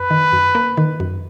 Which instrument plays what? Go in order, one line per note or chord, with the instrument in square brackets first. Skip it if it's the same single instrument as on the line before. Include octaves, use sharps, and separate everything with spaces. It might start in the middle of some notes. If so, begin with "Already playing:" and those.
Already playing: [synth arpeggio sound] F#2 [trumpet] B4
[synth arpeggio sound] D#3
F#2
A#3
D#3
F#2